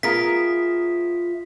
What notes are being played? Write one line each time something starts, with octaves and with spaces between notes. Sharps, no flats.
B3 F4 G#4 A#4 E5 B6